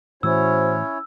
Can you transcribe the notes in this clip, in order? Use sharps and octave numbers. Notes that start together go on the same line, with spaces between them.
A2 E3 C#4 E4 F#4 C5 C#5 E6